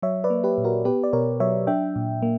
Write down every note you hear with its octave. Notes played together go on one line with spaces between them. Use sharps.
F#3 C#5 E5
B4 D5
A#3
G4 B4
A#2
F#4 A#4
B3 G4 B4
D5
B2 A#4 C#5
F#3 C#5 E5
D4 E5 G5
A#2
A#3